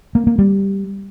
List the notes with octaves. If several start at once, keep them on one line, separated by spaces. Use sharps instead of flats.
A#3
A#3
G3